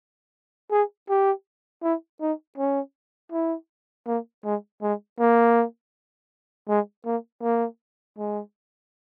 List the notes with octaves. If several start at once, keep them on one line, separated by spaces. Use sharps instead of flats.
G#4
G4
E4
D#4
C#4
E4
A#3
G#3
G#3
A#3
G#3
A#3
A#3
G#3